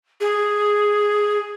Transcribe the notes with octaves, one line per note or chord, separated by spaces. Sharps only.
G#4